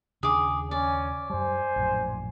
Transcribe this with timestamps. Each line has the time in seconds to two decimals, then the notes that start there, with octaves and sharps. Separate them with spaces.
0.23 D#2 C#3 D4 G#4 D6
0.71 C#4 D5 G#5
1.30 F#2 G3 C5 G#5
1.76 A#1 F#2 A2